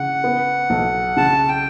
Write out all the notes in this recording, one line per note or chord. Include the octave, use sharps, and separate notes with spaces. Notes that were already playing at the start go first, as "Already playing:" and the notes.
Already playing: C#3 F#5
B3
B1
C#3 A5
G5